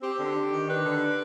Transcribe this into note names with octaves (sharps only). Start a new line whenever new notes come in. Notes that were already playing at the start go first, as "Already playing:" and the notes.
C4 G4
D3
D4
D#3
D4 B4
D3
D4